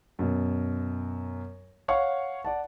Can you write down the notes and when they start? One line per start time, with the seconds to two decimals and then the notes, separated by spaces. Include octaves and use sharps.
0.19 F#2 B2
1.88 C#5 F5 F#5 C#6
2.45 D5 F#5 A5